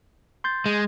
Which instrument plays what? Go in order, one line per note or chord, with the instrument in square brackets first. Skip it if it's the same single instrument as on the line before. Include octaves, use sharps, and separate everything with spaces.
[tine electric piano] C6 G6 A6
[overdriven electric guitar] G#3